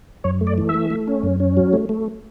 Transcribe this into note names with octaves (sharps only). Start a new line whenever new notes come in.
F#2 C#5
A3
D5
E3
E5
A3
A3
C#4
F#2
C#4
F#3
A3
A3